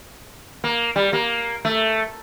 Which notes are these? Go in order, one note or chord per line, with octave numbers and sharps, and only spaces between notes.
A#3
G3
A#3
A3